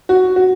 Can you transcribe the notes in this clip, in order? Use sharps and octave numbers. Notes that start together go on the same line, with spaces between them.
F#4
F#4